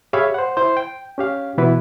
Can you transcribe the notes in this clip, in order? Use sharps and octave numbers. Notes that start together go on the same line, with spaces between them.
G4 G#4 C#5 E5 F5 B5
C5 F#5
E4 C5
G5
C#4 G4 F5
B2 E3 B3 E4 B4